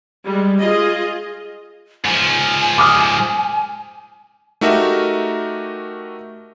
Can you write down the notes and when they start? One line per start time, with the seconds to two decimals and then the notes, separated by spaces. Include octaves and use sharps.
0.24 G3 G#3
0.58 F4 G#4 D#5
2.05 G#2 F3 G#5
2.78 D6 D#6 F6
4.61 A3 D#4 F#4 G4 A#4 E5